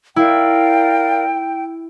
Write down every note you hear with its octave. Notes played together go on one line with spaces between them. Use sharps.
E4 A#4 D5 F5 G5